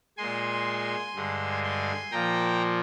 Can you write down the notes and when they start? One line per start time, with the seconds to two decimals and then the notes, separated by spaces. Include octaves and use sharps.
0.17 A#2 G#3 G#5 C6
1.14 G2 D3 G#3
1.63 G#5 C6
2.11 A#2 F3 A#3 G5 A#5